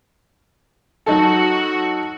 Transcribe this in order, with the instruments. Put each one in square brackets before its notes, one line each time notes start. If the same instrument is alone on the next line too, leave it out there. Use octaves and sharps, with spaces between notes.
[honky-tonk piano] F#3 D#4 A4 [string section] F#4